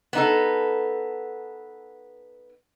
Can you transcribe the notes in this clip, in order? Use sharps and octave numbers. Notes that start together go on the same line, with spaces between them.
B3 D#4 A4